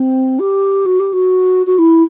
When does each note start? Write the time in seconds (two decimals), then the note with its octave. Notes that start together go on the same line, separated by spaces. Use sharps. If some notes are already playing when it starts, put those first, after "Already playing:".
Already playing: C4
0.39 G4
0.86 F#4
1.00 G4
1.13 F#4
1.67 F#4
1.78 E4